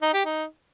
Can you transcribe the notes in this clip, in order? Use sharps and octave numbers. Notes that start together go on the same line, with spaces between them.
D#4
G4
D#4